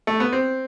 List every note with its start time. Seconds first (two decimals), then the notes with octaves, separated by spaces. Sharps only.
0.07 A3
0.20 B3
0.33 C4